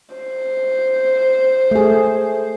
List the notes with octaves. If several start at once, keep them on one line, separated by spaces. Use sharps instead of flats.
C5
A3 G#4